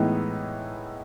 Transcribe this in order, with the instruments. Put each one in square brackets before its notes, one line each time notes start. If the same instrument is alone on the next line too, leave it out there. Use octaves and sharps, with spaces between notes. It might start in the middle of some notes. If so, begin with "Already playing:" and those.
Already playing: [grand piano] A2 E3 G#3 B3 D#4